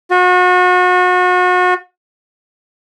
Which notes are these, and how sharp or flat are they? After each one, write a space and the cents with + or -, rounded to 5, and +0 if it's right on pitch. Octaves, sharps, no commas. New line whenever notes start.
F#4 -35